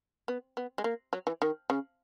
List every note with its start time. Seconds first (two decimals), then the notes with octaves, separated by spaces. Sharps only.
0.28 B3
0.57 B3
0.78 G#3
0.84 A#3
1.13 F#3
1.27 E3
1.42 D#3
1.70 C#3